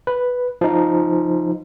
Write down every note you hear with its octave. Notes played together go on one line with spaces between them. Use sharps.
B4
F3 D#4